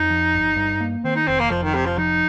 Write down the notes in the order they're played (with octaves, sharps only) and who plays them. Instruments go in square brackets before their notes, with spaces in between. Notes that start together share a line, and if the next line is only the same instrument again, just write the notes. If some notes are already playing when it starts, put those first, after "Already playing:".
Already playing: [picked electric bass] F2 [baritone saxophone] D#4
[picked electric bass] F3
G1
G2
A#3
[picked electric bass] D#3 [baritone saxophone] C4
[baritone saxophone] D#4
[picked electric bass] F1 [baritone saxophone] C4
[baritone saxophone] A#3
[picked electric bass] F2 [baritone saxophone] F3
[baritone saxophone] D#3
[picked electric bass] F1 [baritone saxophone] C3
[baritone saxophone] F3
[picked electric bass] F3 [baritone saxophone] D#4